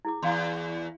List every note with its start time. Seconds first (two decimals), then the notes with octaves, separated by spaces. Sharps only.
0.05 E4 G#4 D6
0.23 E2 F5 C6